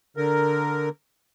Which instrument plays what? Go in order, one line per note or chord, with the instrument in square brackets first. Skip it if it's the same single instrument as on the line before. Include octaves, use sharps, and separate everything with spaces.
[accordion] D3 A#4